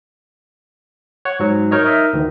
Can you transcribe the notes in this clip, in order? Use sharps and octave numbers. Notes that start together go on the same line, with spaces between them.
C#5 F#5
G#2 F#3
D#4 A#4 C#5 D#5
D#4 A#4 D#5 E5
D2 D#3 E3